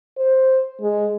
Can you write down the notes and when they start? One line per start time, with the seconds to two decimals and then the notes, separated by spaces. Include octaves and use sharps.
0.18 C5
0.81 G#3